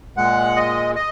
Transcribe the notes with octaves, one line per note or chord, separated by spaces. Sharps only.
A#2 G#3 F#5
D#5
D#5